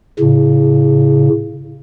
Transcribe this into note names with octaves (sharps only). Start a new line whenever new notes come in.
A2 C#3